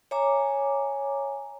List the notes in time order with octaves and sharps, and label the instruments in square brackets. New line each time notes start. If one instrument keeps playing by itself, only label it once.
[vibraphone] C#5 E5 G#5 A#5 D6